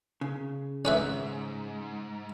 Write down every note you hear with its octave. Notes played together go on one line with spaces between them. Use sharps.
C#3
G#2 C#4 B4 E5